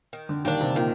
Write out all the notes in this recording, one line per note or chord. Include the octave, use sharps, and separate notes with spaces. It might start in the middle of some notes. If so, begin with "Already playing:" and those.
D#3
D3
D#3 G3 A#3 D4
C3
A#2 D#3